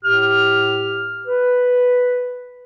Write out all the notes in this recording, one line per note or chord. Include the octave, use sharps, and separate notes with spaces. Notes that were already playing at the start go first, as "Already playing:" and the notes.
A2 G4 F6
B4